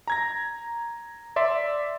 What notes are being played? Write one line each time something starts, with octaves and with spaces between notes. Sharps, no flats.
A#5 G#6 A#6
D5 E5 C6